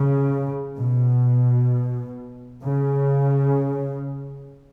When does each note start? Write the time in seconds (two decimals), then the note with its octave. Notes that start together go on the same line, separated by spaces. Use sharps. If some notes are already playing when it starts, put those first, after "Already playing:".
Already playing: C#3
0.78 B2
2.65 C#3